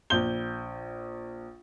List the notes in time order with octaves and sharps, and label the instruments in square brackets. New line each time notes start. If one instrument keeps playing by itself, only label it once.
[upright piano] A#1 G6 G7